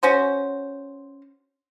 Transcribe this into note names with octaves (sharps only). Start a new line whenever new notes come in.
C#4 F#4 C5